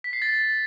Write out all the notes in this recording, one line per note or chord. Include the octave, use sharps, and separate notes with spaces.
B6
C7
A6